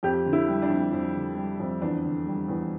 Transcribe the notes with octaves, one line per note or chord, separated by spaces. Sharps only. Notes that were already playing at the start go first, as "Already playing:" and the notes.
F2 G4
D3
E4
G3
D4
F2
F2
D3
G3
F2
E2 D4
D3
G3
E2